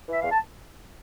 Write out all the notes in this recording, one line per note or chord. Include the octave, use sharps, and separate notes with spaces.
E3 E5
E2 F5
A5